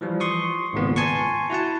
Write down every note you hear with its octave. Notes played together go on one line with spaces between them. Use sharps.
E3 F3 G3
C6 C#6 D#6
G#1 C#2 A#2 B3
G#5 A5 C6 C#6
E4 F#4 F#5 A5